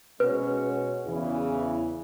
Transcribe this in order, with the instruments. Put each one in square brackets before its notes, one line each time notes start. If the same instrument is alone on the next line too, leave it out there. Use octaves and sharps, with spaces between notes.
[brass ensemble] B2 G#3 C#4 F#4 C#5 [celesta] B4
[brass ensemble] E2 C#3 E3